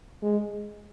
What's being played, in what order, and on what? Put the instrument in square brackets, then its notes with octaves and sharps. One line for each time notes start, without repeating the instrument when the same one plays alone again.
[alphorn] G#3